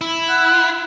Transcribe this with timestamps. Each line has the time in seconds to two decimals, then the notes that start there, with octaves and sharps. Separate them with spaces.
0.01 E4
0.29 F#5